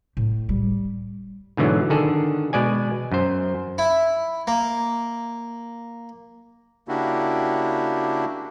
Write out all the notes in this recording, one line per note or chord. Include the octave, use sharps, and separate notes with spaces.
A2
G3
G#2 B2 D3 E3 F#3
D3 D#3 G#4 A4
B2 G#3 D5 G#5
F#2 C5
E4
A#3
C#3 A#3 D4 E4 F#4 G4